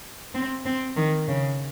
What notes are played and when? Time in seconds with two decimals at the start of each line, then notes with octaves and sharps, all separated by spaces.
0.35 C4
0.66 C4
0.96 D#3
1.28 C#3